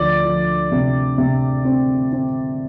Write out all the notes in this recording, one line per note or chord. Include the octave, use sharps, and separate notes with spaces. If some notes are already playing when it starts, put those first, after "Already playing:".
Already playing: D2 F3 D5
F3
C3
C3
C4
C4